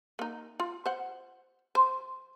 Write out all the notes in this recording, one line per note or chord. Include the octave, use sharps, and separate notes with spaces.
A#3 D#4
F4
C5 F#5
C5